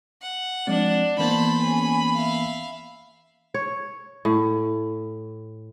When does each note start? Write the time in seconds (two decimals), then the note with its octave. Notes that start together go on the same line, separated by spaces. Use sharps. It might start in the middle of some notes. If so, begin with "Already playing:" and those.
0.22 F#5
0.67 F3 G#3 C4 D4
1.19 E3 A#3 B3 C5 A5 B5
1.61 C#4 G#4
2.15 E5 F5
3.54 C#5
4.25 A2